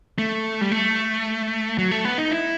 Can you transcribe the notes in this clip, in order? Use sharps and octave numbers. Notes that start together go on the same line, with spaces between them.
A3
G3
A3
F#3
A3
B3
D#4
E4